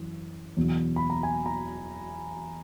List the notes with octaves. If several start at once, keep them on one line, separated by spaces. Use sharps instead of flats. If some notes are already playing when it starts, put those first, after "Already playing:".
Already playing: F#2 E3
E2 B2 F#3
B5
A#5
G#5
A#5